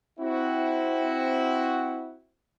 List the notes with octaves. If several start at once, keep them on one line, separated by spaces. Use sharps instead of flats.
C4 E4 F#4